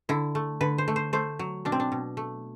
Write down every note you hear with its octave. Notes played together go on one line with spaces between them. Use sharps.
D3 E4
A3
D3 B4
C5
A3
C5
A3 C5
F#3
B2 D4
C4
D4
B2
A3